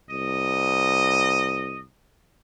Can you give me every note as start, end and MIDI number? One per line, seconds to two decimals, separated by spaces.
0.10 1.85 36
0.10 1.80 75